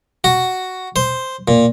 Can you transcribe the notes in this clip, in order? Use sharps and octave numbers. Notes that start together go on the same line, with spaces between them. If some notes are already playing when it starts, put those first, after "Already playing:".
F#4
C5
A#2